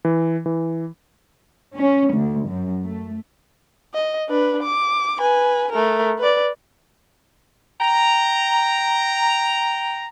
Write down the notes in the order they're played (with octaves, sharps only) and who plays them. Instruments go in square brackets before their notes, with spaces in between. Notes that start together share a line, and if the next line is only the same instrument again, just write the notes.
[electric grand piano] E3
E3
[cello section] C#4
D2
F#2
A3
[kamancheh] D#5
D4 B4
D6
B4 G#5
A3 A#4
B4 D5
[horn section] G5 A#5